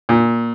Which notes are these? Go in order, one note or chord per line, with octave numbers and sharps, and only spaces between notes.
A#2